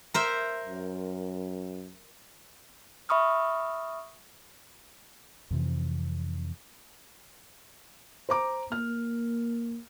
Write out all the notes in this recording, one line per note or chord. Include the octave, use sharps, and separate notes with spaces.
A#4 C5 E5
F#2
E5 B5 C#6 D#6 F6
F2 C3 E3
C5 A#5 D6
A#3 F6